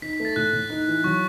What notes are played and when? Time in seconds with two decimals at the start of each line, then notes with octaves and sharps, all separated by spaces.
0.02 D#4 B6
0.13 B6
0.20 A3
0.25 A6
0.36 A2 F#6
0.53 A2
0.70 D#4
0.88 E3
1.04 F#3 C#6